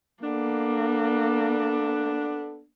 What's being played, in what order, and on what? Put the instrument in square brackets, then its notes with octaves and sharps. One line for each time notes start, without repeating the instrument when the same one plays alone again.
[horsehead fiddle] A#3 [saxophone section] B3 D4 [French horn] A4